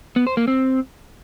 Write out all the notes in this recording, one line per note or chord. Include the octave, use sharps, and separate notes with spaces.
B3
C5
A#3
C4